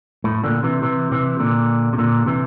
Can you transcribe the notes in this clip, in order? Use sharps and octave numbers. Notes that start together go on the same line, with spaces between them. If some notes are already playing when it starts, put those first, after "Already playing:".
A2
A#2 D3
C3 E3
C3 E3
C3 E3
A#2 D3
C3
A#2 D3
C3 E3